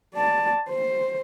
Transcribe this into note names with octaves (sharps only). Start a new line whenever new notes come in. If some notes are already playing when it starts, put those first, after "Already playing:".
D5 A5
C5